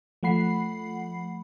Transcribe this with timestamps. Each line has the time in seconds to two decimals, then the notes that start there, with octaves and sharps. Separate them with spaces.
0.23 F3 A3 F#5 B5 C7